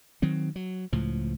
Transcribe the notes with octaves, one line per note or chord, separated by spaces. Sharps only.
D#3 F#3 C4
F#3
C#2 A2 F3